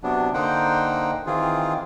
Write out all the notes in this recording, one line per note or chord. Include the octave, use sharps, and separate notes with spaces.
C3 F#3 B3 D4
D3 A#3 D#4 C5 F#5 G5
D#3 E3 C4 F4 G#4